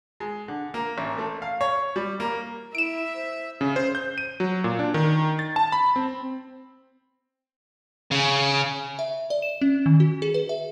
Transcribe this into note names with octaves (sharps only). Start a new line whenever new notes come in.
G#3
D3
A#3
A1
A3
F5
C#5
G3
A#3
E4 E5 D7 E7
C5
C#3
C5
G6
D#7
F#3
A#2
D4
D#3
A6
A5
B5
C4
C#3
E5
D5
E7
C#4
D#3
F#4
G#4
B4
E5